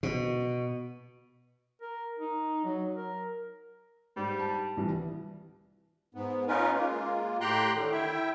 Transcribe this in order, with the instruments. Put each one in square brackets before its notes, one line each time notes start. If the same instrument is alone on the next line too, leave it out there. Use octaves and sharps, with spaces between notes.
[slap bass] B2
[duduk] A#4
D#4
F#3
A#4
[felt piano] G#2 [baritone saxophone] G3
[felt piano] A5
C2 E3
[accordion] G#2 B3
C#4 D#4 F4 A#4 B4
G#3 A#3 F4
A2 G4 G5 A#5 C6 F#6
D3 D#3
E4 E5 G5